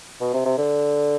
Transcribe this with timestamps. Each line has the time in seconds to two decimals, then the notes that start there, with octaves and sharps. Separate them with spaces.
0.20 B2
0.34 C3
0.45 C3
0.58 D3